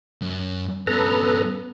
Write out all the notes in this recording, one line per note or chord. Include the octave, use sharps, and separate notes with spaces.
F#2
G2 B3 C#4 A4 B4 A#5